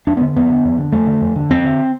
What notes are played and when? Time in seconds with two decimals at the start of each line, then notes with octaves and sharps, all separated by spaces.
0.07 F2 D4
0.17 B3
0.21 D3
0.36 F2 B3
0.50 D3
0.65 F2
0.78 D3
0.92 F2 A3
1.07 D3
1.22 F2
1.36 D3
1.50 F2 C4
1.65 D3